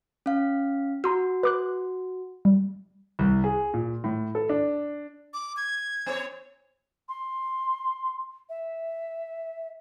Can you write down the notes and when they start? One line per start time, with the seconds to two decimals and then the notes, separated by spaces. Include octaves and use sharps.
0.26 C#4 F5
1.04 F#4 A#5 C6 E6
1.43 B4 D6 F#6
2.45 G3
3.19 C2
3.44 G#4
3.74 A#2
4.04 A2
4.35 A4
4.49 D4
5.33 D6
5.57 G#6
6.06 B3 C#5
7.09 C6
8.49 E5